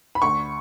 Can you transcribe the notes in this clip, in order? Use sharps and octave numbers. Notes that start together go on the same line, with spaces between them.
B5
D2 C#6